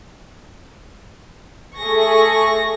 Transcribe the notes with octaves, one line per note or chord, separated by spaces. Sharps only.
A3 G#4 C#6 A#6